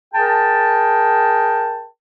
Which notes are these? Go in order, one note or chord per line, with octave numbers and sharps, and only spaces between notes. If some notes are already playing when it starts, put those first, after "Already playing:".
G#4 A#4 G5 A5